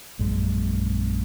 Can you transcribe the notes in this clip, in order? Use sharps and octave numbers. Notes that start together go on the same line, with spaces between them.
A#1 F#2 G#3